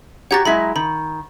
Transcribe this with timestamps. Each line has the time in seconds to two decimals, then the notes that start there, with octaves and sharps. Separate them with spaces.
0.31 F#4 G4 C#5 F#5 A#5 A6
0.45 F#3 G#3 E4 B5 B6
0.76 D#3 B5